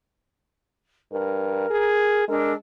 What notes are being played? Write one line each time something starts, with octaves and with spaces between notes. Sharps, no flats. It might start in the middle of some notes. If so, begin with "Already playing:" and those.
G2 A#4
G#4
G#3 D4 A4 A#4